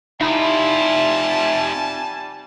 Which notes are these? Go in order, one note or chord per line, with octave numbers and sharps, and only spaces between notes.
C3 G3 D#4 F4 E5 G#5 A5 B5